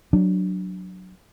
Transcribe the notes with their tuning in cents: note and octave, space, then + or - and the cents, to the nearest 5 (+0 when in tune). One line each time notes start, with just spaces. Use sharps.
F#3 +0 D4 +5